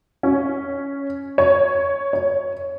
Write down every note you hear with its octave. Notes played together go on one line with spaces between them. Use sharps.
C#4
C#5
C#5